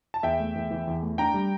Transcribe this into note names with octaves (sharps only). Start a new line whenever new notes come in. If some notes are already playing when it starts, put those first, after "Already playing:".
A5
E2 E5 G5
A3
E2
E3
E2
A3
D4 G5 A#5
G3